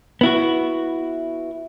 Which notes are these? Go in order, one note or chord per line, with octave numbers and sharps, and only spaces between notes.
B3 E4 F#4